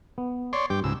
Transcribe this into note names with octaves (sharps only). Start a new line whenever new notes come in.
B3
C#5 D5 C6
G2 G5 D6
C#2 G#2 E6